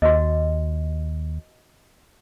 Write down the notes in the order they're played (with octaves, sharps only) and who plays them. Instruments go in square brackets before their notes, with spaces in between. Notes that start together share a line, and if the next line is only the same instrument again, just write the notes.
[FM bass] D#2 [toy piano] F#4 D#5